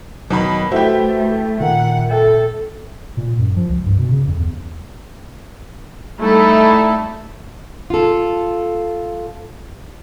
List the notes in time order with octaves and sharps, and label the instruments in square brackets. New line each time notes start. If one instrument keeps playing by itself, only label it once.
[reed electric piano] E2 [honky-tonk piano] B2 D#3 B5 [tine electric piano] F#3
[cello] A3 [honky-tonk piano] E4 G4 [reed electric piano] F#4 A4 B4 [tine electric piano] C5
[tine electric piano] A#2 [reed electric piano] D#3 A#4 [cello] F#5
[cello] A4 [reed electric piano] E5 G5
[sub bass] A#2
F#2
F3
C#2
G2
B2
C#3
F2
E2
[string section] G3 A3 D#4 E4 A4
[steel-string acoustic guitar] F4 A4